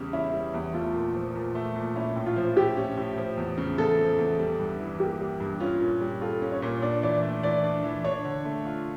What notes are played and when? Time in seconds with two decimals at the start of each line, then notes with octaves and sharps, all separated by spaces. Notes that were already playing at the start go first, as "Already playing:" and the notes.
Already playing: E2 C#3 G3
0.13 C#4 E4
0.33 G3
0.54 E2
0.74 A3 F4
0.94 A#2
1.15 F3
1.35 A#2
1.55 A3
1.76 A#2
1.95 C#4 E4
2.16 A2
2.26 F4
2.36 F3
2.56 E4 G4
2.77 C#4
2.97 A2
3.18 F3
3.38 E2
3.58 C#3
3.78 E2 A4
3.98 F3
4.19 E2
4.39 G3
4.59 G2
4.80 E3
5.00 A#3 G4
5.20 G3
5.40 G2
5.60 C#4 F4
5.81 A#2
6.01 G3
6.21 F4 A4
6.42 C#4
6.52 C#5
6.62 A#2
6.82 D4 D5
7.02 E3 D5
7.23 A3
7.43 E3 D5
7.64 D4
7.84 E3
8.04 D4 C#5
8.25 D3
8.45 A3
8.65 F4